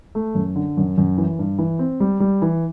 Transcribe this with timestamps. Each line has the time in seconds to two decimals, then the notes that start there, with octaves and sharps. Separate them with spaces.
0.15 A3
0.35 F#2
0.56 D3
0.77 F#2
0.98 F#2
1.18 E3
1.39 G2
1.59 E3
1.79 C4
2.00 G3
2.20 G3
2.42 E3